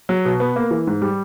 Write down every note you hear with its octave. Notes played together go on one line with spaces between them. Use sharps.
F#3
B2
B3
A#3
E3
G#2
G3